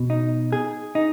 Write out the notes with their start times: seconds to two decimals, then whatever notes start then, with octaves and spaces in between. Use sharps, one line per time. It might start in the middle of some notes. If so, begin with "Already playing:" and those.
Already playing: B2
0.10 D#4
0.52 G#4
0.95 D#4